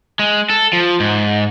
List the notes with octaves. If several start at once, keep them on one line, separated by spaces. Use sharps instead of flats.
G#3
A4
F3
G#2